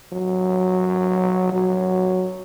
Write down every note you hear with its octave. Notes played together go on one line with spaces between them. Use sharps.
F#3
F#3